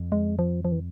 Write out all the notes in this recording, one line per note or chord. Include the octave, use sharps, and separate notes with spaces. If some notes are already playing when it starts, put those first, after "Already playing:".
Already playing: F2
G#3
F3
F3
E3